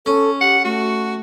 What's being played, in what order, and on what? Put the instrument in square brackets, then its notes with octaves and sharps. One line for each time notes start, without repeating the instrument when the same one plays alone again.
[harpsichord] C#4 [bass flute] A4
[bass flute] G4 [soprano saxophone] F#5
[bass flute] A3 [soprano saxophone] F#4